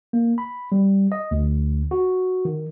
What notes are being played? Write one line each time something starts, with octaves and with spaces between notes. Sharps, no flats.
A#3
B5
G3
D#5
D2
F#4
D#3